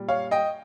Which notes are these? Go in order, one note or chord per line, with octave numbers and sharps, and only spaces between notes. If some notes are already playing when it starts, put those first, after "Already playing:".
Already playing: A#2 G3
C#5 F5
D#5 G5